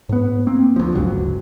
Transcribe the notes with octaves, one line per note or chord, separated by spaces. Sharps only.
G#2 B3
A#3 C4
D2 F3
D1 G1 C#2 F#3